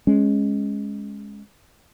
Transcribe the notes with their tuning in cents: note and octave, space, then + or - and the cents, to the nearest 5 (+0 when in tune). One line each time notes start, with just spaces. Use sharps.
G#3 +0 C#4 -10